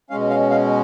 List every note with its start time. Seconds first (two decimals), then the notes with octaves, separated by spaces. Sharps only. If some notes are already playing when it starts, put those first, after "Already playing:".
0.10 B2 G#3 C#4 F5
0.30 F5
0.50 F5